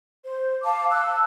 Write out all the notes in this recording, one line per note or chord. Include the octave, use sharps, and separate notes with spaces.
C5
F5 A5 D6
A5 E6 F#6